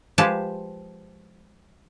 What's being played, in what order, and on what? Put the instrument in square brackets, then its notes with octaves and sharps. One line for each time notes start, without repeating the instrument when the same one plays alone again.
[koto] F3 G#3 G4 B4 A5